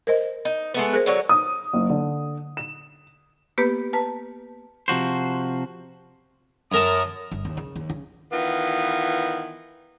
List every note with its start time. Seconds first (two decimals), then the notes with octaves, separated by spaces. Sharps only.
0.07 A#4 C5 D#5
0.45 D#4
0.74 G#3 A3 B3
0.93 G#4 A#4 C5
1.06 D3 F#3 C#5
1.29 D#6
1.73 F#1
1.90 D3
2.57 E7
3.58 A#3 B3 G4 B4
3.93 B4 A5 A#5
4.88 C3 F3 F#4 C5
6.72 F#2 A#4 A5 D#6
7.31 G1
7.45 D#2
7.57 C#3
7.76 D#2
7.90 C#3
8.31 D#3 E3 B3 F4